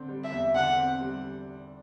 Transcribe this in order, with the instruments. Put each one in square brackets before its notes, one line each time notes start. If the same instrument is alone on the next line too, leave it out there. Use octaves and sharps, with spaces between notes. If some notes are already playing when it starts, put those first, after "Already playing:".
Already playing: [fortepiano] D3 C4
G3
[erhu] E5
[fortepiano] E2
[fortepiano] D3 [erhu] F#5
[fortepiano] C4
G3